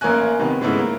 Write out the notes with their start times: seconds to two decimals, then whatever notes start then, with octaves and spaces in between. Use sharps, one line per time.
0.01 A1 A#3 A#4 C#5 G#5 F#6
0.39 C3 D#3 B3
0.61 G#2 C#3 G#3 A3 B3 E4
0.79 A#3